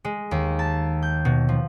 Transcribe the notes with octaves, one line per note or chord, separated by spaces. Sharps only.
G#3
D#2
A5
G6
B2
F3